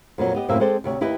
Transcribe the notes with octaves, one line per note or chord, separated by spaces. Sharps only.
F2 A#2 F#3
B3 G4 D#5
F#2 A2 C3 A#3 C5 E5
G#3 C4 A4 C5 D5
D2 C3 C#5
D#2 E4 G4 B4 D#5